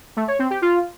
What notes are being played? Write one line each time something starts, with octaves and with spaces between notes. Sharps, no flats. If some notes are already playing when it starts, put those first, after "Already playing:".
A3
C#5
C4
G4
F4